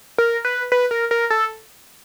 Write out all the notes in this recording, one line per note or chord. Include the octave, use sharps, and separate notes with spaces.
A#4
B4
B4
A#4
A#4
A4